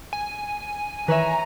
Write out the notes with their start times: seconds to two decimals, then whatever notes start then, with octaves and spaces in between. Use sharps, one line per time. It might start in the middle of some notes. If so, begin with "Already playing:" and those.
0.13 G#5
1.08 D#3 E3 B4 C#5 E5 A#5